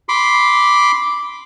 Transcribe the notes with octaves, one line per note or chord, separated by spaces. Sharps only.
B5 C6 D6